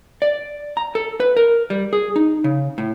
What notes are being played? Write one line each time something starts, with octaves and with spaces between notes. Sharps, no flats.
D5
A#5
A4
B4
A#4
G3
G#4
D#4
C#3
A2